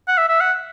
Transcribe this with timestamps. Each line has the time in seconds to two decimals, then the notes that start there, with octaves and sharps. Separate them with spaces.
0.08 F#5
0.18 E5
0.29 E5
0.41 F#5